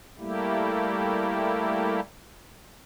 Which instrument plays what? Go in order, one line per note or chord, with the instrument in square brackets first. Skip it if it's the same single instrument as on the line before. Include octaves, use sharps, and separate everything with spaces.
[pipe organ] G3 A3 A#3 E4 G4